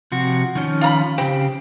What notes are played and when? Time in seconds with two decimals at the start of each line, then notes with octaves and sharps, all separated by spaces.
0.12 C3 F3 F#4
0.55 D#3 F3 C#4
0.81 F4 A#5 B5
1.18 C#3 C4 G4